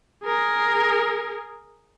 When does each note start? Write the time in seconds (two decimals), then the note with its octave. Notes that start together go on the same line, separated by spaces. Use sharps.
0.24 G#4 A#4